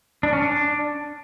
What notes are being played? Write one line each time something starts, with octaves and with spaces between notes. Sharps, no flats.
D4
C#4
D4